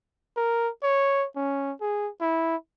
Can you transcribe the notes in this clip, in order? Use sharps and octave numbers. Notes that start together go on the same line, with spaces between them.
A#4
C#5
C#4
G#4
E4